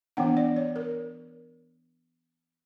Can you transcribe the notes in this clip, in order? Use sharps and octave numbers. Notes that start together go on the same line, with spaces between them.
E3 B3 D4 F#5
D5
C#5
A#4